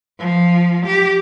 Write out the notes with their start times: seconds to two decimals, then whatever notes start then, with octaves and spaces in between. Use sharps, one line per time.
0.19 F3
0.86 G4